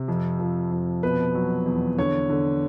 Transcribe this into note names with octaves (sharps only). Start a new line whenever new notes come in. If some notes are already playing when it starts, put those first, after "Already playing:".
Already playing: C3
F2
F3
F2
B2 B4
F#3
E2
D3 C#5
D3